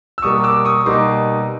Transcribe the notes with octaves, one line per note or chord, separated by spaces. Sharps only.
E6
B2 G3 A#3 C#6 D#6
D6 E6
C#6 D#6
B2 G3 A#3 D#4 C6 D6